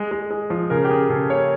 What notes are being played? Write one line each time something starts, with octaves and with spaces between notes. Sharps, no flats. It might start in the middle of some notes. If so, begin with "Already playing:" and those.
Already playing: G#3
G#3
G#3
F3
C#3 A#4
G4
C#3 G#4
C#3 A4
A#3 C#5